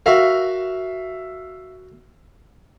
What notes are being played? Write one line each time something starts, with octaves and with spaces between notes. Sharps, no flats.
F#4 A#4 E5 F5